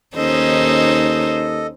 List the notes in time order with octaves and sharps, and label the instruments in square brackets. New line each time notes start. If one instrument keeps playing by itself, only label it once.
[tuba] D#2 [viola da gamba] C#4 D#4 C5 [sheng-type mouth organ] A4 D#5